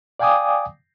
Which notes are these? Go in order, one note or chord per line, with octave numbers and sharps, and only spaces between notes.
D5 F5 G5 G#5 D6 D#6